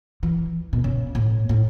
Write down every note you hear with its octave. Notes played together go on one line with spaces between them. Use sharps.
E3
B2
C#3
A2
A2